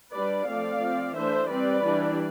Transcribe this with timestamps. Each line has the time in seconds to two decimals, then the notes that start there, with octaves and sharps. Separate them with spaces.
0.13 G3 D4 B4 D5
0.47 F3 A3 C4 D5 F5
0.81 F3 C4
1.15 E3 A3 D4 C5 E5
1.49 G3 C4 B4 D5
1.83 E3 G3 D4